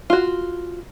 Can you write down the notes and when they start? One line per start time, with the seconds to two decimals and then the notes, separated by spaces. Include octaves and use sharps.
0.10 F4 F#4